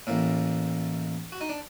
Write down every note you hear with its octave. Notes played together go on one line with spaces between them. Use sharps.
A1 A2 A#3
F#4
D#4
D4